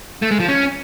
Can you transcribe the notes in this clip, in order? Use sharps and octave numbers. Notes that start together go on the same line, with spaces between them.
A3
G#3
F3
C#4